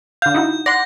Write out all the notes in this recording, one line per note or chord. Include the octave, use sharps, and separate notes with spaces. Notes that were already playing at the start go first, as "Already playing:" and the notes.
D3 F5 G6
D#4 E4 F#4
D5 F#5 C6 A#6